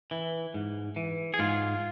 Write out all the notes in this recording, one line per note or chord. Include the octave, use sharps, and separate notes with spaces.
E3
G#2
E3
G#4
G#2 F4